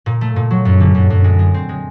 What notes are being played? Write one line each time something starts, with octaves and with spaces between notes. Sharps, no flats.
A#2
A3
A#2
F#3
F#2
D3
F#2
F#2
G#3
G#3
C4
G#3